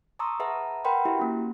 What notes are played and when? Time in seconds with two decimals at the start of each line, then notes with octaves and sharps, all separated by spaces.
0.19 A5 A#5 C6 C#6 D#6 E6
0.40 G#4 B4 E5 F#5 A5 A#5
0.85 A#4 B4 F#5 G5 B5 C6
1.05 E4 F#4 G4 E5
1.19 A#3 C#4